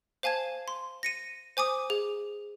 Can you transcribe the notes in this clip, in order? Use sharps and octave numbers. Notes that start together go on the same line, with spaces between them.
C5 F5 G#5 A5 G#6
C6
A#6 C#7 D#7
C5 G#5 D6 D#6
G#4